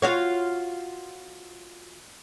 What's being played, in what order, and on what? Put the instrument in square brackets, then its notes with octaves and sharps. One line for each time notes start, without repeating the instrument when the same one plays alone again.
[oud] F4 F#4 C#5